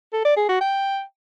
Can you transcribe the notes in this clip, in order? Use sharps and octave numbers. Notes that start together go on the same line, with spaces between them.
A4
D5
G#4
F#4
G5